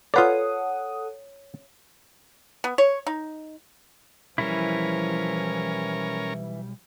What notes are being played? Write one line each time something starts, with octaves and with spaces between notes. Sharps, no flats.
F4 A4 B4 C#5 D5 F#5 D#6 C7
B3
C#5
D#4
B1 E3 F3 G3 C#4 E4 A#4